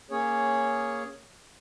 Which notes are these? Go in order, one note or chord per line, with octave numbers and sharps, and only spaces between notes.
A#3 C#4 G#4 C#5